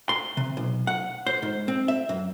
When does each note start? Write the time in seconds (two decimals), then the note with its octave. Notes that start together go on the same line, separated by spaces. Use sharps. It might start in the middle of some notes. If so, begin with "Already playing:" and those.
0.09 C6
0.37 C3
0.57 B1
0.87 F#5
1.27 C5
1.42 G#2
1.68 C4
1.88 E5
2.09 F#2